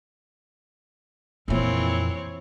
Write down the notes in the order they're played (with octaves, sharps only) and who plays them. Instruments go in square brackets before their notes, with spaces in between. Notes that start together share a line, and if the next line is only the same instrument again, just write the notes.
[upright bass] F2 A#2 [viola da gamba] E3 C4 C#5